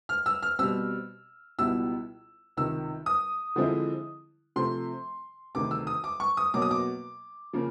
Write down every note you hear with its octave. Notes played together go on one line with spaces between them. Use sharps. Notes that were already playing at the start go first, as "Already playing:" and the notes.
F6
E6
F6
B2 G3 C4 E6
C#2 B2 G3 B3 E4 E6
C#2 C3 D#3 E6
D#6
D3 F3 G#3 C4 E4
C3 F3 A3 C4 C6
D2 C3 D#3 D6
E6
D#6
D6
C#6
D#6
B2 F#3 A#3 D6
D#6
D6
C#3 F3 A#3